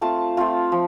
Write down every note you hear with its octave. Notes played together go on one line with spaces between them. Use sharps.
A3 C4 F4 A5
A3 C4 F4
F3